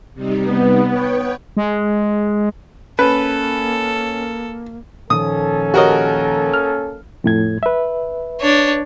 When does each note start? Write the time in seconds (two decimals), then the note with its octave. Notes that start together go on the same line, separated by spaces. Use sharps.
0.14 C3 G3 D#4
0.46 B3
0.86 B4 C#5 G5
1.57 G#3
2.99 A#3 C#4 A4 B4
5.10 A#2 D#3 F3 A#3 C#4 A4 D#6
5.74 F#4 G4 A#4 C#5 D#5
6.54 F6
7.24 F2 A2 G#6
7.63 B4 E5
8.41 D4 C#5